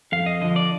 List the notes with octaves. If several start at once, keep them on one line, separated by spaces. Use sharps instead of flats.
F2 F5
D#5
D3 F3 D#5
D5